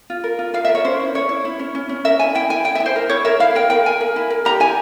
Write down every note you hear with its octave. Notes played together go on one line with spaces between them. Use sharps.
F4
A#4
F4
F4 F5
E5
A#4
C#5
C#4 C5
E4
C#4 C#5
E4
E4
C#4
C#4
C#4
A#4 E5
E4 G#5
E4 G5
E4 G#5
E4 G5
E5
E4
C5
A#4
E4 C#5
A#4 E5
E4 F5
A#4 G5
A#4 G5
A#4 G#5
A#4
E4
A#4
G4 A#5
E4 G#5